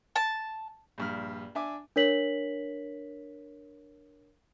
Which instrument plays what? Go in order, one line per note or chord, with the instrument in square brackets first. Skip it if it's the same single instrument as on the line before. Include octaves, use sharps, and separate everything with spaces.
[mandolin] A5
[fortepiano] A#1 G2 F6
D4 E5 G#5 D6
[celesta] D4 A#4 C#5 B6 F#7